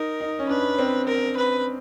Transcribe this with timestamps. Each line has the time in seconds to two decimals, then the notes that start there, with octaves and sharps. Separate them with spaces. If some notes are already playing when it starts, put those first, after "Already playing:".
Already playing: D#4 A#4
0.21 D#4
0.39 C#4
0.49 D4 B4
0.79 C4
1.07 A#4
1.37 B4